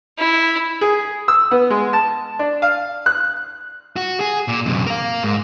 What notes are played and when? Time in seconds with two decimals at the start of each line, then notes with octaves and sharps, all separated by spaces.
0.18 E4
0.81 G#4
1.28 E6
1.51 B3
1.70 G#3
1.93 A5
2.39 D4
2.62 F5
3.06 F#6
3.96 F#4
4.20 G#4
4.48 A#2
4.66 F#2 C3
4.86 A#4 F5
5.23 G#2